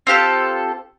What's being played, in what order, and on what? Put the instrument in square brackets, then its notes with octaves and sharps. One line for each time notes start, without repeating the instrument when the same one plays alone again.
[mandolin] C4 F4 G4 A4